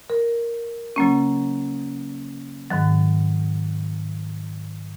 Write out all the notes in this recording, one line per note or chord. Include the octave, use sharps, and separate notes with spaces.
A#4
C#3 F#3 A#3 C#4
G#2 D#3 F#3